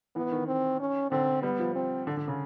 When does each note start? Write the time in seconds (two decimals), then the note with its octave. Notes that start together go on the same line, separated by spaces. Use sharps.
0.15 E3 B3
0.32 D#3
0.47 C4
0.80 C#4
1.11 D3 C4
1.42 G3 B3
1.59 F3
1.75 C4
2.07 D3
2.17 D3
2.28 C#3